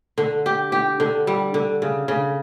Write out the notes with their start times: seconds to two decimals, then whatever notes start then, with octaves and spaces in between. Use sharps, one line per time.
0.18 D3
0.46 G4
0.72 G4
1.00 D3
1.27 G3
1.54 D3
1.82 C#3
2.08 C#3